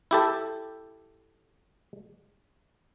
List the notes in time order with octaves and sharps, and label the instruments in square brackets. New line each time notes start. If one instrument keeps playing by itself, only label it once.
[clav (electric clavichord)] E4 G4 A4